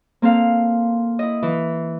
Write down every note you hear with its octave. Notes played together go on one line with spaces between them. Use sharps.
A#3 C4 A4 F5
E4 D#5
E3